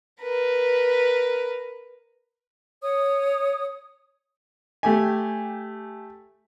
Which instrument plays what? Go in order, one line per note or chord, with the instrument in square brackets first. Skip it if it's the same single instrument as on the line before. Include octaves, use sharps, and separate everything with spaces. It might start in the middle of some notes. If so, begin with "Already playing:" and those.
[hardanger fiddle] A#4 B4
[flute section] C#5 D#6
[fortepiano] A3 G4 G#5